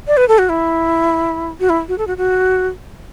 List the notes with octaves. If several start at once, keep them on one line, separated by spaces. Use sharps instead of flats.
D5
B4
A4
F#4
E4
F#4
E4
F#4
A4
F#4
F#4